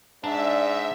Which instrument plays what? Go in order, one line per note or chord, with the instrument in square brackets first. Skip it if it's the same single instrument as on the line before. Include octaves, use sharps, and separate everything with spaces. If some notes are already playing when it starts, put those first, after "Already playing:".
[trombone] G#2 [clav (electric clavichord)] D4 A5 A#5 [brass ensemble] D5 [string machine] E5